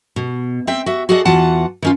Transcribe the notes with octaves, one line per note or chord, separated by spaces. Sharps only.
B2
C4 E5 G5
F#4 E5
F#4 G#4 A4 D5 D#5 F#5
E2 E3 F4 F#4 F#5 A5
D#3 C#4 F4